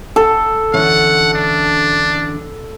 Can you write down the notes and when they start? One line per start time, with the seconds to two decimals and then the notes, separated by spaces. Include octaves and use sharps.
0.16 A4
0.74 D3 E3 C#4 F#5
1.33 D4